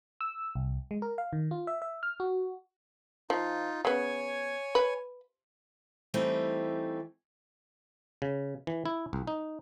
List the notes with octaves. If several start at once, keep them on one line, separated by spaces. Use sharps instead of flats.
E6
C2
G#3
A#4
F5
D#3
F4
E5
E5
F6
F#4
F3 D#4 F4
C#3 B3 C#5 G#5
B4
E3 G3 A3 C4 D#4
C#3
E3
E4
C2
D#4